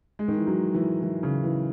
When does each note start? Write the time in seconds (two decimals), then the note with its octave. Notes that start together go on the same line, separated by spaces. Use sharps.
0.19 G#3
0.28 D#3
0.38 E3
0.47 F#3
0.74 E3
1.03 E3
1.23 C#3
1.44 E3